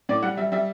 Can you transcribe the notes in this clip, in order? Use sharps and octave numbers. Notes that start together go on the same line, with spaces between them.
A2 D5
G3 F#5
G3 E5
G3 E5